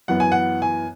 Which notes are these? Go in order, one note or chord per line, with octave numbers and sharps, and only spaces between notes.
F#2 E3 B3 F#5
G#5
F#5
G#5